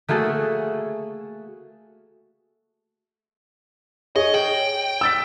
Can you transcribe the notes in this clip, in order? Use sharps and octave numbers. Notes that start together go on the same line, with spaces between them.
A3 A#3 F#4 G#4 A4
G#4 C#5 D#5
G5 F#7
E6 A6 B6